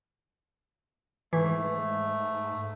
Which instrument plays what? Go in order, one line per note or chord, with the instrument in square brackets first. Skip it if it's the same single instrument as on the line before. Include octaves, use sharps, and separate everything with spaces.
[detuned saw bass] G#2 [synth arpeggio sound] E3 [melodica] A3